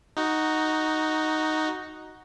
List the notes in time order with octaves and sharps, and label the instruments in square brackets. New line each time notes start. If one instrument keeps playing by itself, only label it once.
[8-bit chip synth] D#4 F#4